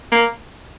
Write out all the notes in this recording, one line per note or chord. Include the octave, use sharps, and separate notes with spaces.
A#3